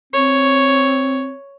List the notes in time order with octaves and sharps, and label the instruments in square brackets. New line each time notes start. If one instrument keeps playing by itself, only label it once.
[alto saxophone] C4 [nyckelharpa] C#5